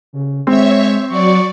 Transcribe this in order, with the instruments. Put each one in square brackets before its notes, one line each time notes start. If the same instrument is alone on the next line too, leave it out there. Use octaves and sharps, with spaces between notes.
[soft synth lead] C#3
[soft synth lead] G#3 [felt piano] C4 [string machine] C#5 E5 C#6
[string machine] F#3 D5 [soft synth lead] C#6